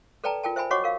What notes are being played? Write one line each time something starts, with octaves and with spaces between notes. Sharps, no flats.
A4 B4 D5 G5 A5 A#5
F4 A#4 G5 A5
C5 E5 G5 G#5 B5
F#4 C#5 D#5 F#5 C#6 D6
A#4 F5